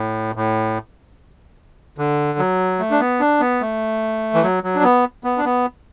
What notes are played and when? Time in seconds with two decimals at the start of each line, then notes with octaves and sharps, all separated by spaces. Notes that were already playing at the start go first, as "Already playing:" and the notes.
Already playing: A2
0.35 A2
1.98 D3
2.39 F#3
2.80 A3
2.91 D4
3.00 B3
3.20 D4
3.40 B3
3.61 A3
4.34 E3
4.43 F#3
4.63 F#3
4.76 D4
4.83 B3
5.24 B3
5.37 D4
5.45 B3